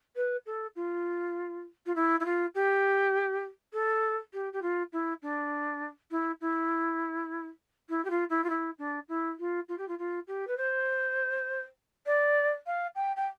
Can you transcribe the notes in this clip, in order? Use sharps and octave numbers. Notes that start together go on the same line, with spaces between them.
B4
A4
F4
F4
E4
E4
F4
G4
A4
G4
G4
F4
E4
D4
E4
E4
E4
G4
F4
E4
F4
E4
D4
E4
F4
F4
G4
F4
F4
G4
B4
C5
D5
F5
G5
G5